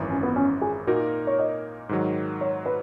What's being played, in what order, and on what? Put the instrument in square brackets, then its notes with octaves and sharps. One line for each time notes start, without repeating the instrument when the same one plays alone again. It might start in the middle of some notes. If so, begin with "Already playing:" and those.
Already playing: [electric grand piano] G#1 F#2 E3
[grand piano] C#4
B3
C#4
G#4
[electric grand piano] A#2 A#3 D#4 A#4 [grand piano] F#4
[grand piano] C#5
D#5
[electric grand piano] G#2 D#3 F#3
[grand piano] C#5
B4